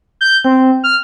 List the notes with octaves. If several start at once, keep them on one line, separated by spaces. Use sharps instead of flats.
G6
C4
F6